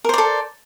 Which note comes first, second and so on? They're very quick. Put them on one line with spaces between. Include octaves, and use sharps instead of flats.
A#4 C5 D5 A4